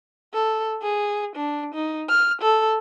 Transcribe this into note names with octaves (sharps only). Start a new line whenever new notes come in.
A4
G#4
D4
D#4
F6
A4